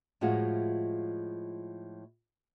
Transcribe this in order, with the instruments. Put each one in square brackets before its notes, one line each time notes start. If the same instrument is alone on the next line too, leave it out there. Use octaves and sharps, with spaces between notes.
[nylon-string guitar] A2 F3 G#3 F4 F#4